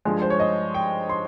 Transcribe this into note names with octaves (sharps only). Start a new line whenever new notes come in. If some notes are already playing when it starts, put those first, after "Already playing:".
G2 F3 G#3 G#5
C5
C#5
D#5
G5
C6